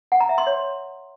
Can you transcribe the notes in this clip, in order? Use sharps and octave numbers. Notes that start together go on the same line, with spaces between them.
F#5
A#5
E5
C6
C#5